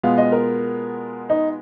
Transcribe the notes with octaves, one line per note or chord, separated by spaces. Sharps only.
B2 G#3 B3 F4 F5
D#5
A#4
D#4